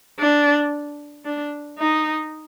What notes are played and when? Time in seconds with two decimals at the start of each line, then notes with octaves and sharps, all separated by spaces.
0.20 D4
1.25 D4
1.78 D#4